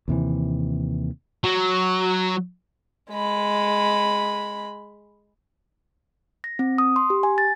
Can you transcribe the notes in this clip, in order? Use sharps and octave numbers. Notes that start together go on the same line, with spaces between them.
D#2 C3 E3
F#3
G#3 B5
A#6
C4
D#6
C6
G4
G#5
A6